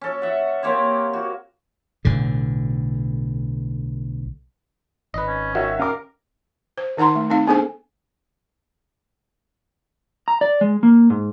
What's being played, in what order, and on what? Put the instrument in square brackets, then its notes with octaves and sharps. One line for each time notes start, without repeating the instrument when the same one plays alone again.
[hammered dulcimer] C#4 A4
E5 F#5
A#3 C4 G4 C#5
F#4
[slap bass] B1 A2 D3
[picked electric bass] G#1 [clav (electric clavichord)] B4 D#5
[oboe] C#4
[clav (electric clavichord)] D#3 [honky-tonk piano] F#4 C#5 E5
[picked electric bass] C#4 [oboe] A#4 [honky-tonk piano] F5 D6
[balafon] C5
D#3 D#4 F#5 A#5 C6
A3
C4 D#4 F5
B3 D4 G#4 A4 C5 G#5
[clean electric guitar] A#5
D5
G#3
A#3
G#2